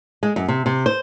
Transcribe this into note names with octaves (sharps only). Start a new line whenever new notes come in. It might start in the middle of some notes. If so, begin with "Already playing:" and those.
G#3
F#2
C3
C3
C5